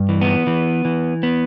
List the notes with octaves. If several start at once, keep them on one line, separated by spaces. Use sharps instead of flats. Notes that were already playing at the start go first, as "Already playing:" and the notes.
Already playing: G2
E3
B3
E3
E3
B3